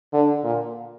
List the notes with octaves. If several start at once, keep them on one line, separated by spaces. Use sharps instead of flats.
D3
A#2